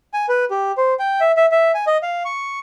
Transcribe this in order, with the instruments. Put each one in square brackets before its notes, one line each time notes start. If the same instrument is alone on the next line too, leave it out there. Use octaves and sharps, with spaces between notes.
[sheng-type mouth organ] G#5
B4
G4
C5
G5
E5
E5
E5
G#5
D#5
F5
C#6